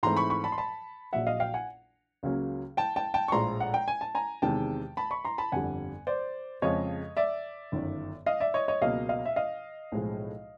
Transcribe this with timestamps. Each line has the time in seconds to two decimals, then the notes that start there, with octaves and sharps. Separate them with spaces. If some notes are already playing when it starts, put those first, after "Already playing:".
0.03 G#2 E3 A3 C4 A#5 C6
0.17 B5 C#6
0.30 B5 C#6
0.44 A5 B5
0.52 C6
0.58 A5 B5
1.13 A#1 A#2 F#3 E5 F#5
1.27 D#5 F5
1.40 F5 G5
1.54 F#5 G#5
2.23 C#2 C#3 F#3 A#3 C#4
2.77 G5 A5
2.96 G5 A5
3.14 G5 A5
3.28 C#6
3.32 A#1 A2 F3 G#3 A#5 C6
3.60 F#5
3.74 G5
3.88 G#5
4.01 A5
4.15 G#5 A#5
4.42 E2 C3 D#3 G#3 G5 A5
4.97 A5 B5
5.11 B5 C#6
5.25 A#5 C6
5.38 A5 B5
5.52 G1 F2 D3 G3 F#5 G#5
6.07 C5 D5
6.62 F2 C#3 F3 G#3 C#5 D#5
7.17 D5 E5
7.72 G1 F#2 D#3
8.26 D#5 F5
8.40 D5 E5
8.54 C#5 D#5
8.68 C#5 D#5
8.82 C#2 B2 F#3 A#3 D#5 F5
9.09 D#5 F5
9.26 E5
9.36 D#5 F5
9.92 B1 A2 F3 G#3